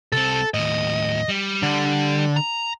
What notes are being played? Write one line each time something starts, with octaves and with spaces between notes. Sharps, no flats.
C2 C4 A4
D#2 A2 D#5
G3
D3
A#5